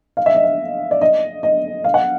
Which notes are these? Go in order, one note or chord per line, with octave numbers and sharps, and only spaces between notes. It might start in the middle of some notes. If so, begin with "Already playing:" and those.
F5
E5
D#5
E5
D5
D#5
D#5
F5
F#5